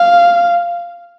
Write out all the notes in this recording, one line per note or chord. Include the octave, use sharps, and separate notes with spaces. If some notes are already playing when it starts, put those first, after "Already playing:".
Already playing: F5